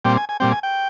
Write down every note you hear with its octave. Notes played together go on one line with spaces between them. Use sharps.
A#2 G3 C4 G5
G#5
G#5
A#2 G3 C4 G5
G#5
G5